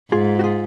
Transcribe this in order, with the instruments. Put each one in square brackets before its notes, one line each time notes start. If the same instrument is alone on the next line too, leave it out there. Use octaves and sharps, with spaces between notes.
[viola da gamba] G#2 [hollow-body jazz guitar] F4 G#4
[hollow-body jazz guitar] F#4
F4 G#4